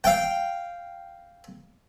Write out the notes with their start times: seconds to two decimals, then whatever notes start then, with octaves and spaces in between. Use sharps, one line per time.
0.04 F5 G5